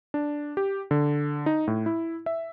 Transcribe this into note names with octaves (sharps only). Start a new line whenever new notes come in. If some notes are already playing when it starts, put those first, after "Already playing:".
D4
G4
D3
D#4
A2
E4
E5